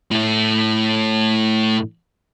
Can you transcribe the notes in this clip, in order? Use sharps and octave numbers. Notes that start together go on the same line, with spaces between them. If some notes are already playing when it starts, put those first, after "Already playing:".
A2 A4